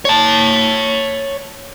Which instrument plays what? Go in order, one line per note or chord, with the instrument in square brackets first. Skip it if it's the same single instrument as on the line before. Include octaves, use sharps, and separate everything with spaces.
[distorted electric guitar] C#5 A5